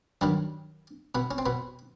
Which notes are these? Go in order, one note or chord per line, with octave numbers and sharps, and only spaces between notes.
G2 D#3 F#3 G3
B2 B3
C#4
C4
B2 B3